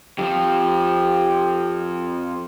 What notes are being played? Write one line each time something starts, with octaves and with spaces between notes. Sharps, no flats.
F2 F3 G4